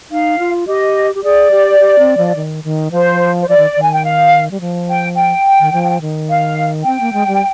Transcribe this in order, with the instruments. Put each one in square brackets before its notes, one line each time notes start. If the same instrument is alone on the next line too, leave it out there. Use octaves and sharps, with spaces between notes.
[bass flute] D#4 [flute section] F5
[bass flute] F4
[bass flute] G4 [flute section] D#5
[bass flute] G4
[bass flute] G#4 [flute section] D5
[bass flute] G4
G4
C4
F3
D#3
D#3
[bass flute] F3 [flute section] C5
[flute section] C5
[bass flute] F3 [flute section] D5
[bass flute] D#3
D#3
[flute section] G#5
G5
F5
[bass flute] G3
F3
[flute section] G5
G5
[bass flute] D#3
F3
D#3
[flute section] F5
[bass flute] C4 [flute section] G5
[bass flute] A#3
G#3
G3